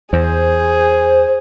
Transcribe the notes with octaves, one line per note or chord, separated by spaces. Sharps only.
E2 G#4 C5